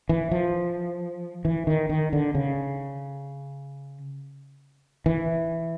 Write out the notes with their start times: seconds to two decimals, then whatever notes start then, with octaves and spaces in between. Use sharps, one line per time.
0.09 E3
0.31 F3
1.45 E3
1.67 D#3
1.89 D#3
2.13 D3
2.35 C#3
5.06 E3